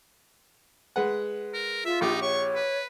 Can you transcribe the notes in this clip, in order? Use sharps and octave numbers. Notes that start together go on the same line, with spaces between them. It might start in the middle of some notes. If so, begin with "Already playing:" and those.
G#3 B4 F#5
A#4
F4 E5
A#1 D#4 G4
C#5 C#6
B4